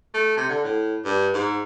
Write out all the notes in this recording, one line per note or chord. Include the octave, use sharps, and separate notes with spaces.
A3
C3
D3
A2
G2
G#2